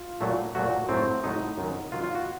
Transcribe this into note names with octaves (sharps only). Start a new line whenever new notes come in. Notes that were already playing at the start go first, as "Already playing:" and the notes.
Already playing: F4
A#2 F#3 A3
A#2 F#3 A3 F#4
A2 F#3 A3 C4
A2 F#3 A3 D#4
F#2 D#3 F#3
F#2 D#3 F#3 F4
F4
F#4